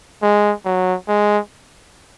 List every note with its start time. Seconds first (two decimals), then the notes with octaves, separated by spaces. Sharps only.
0.22 G#3
0.65 F#3
1.08 G#3